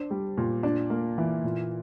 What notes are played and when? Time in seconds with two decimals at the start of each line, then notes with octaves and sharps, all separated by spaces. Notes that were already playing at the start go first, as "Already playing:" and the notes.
Already playing: D4 C5
0.11 G3
0.38 A#2
0.63 D4
0.90 A#3
1.18 E3
1.44 A#2